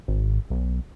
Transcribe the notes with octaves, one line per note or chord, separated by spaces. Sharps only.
G#1
B1